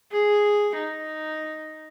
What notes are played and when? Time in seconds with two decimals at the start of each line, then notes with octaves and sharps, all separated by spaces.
0.12 G#4
0.78 D#4